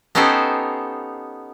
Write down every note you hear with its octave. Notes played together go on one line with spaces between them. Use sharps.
B3 C#4 D#4 G4 A4 C5